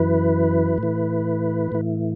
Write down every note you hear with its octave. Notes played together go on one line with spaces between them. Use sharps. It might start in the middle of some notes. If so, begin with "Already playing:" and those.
Already playing: F#2 E3 B4
A2
E3
A2 E3